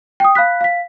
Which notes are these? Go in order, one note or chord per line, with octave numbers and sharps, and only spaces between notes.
G5 D#6
F5 B5 F#6 B6
F5 B6